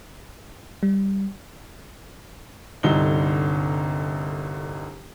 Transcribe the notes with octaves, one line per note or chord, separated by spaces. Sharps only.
G3
G1 C2 D3 D#4 G7